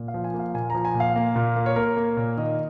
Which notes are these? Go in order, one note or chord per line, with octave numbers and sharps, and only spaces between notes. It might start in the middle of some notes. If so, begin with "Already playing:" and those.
Already playing: A#2
F5
F3
G#5
A#3
F5
A#2 G#5
F3 A#5
G#5
A#2
F5
A#3
A#2
A#3
C#5
A#3 A#4
A#3
A#2
D#3 D#5